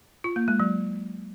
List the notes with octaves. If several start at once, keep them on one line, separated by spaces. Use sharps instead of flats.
F4
A#3
G#3
F#3